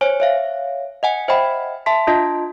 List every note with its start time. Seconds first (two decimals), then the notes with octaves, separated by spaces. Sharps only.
0.01 C5 C#5 G#5
0.20 C#5 E5 F5
1.03 D#5 F#5 G#5
1.28 C5 D#5 E5 F#5 G5 B5
1.86 E5 A5 C6 B6
2.07 D4 F4 D#5 A5 C6